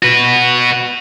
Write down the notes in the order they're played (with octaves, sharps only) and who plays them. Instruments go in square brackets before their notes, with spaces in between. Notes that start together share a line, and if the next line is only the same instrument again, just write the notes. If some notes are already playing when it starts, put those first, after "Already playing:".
[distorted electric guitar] F#4 B4